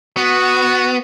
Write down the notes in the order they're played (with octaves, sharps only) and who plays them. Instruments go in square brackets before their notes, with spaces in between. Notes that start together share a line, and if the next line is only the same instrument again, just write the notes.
[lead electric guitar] B3 [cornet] F#4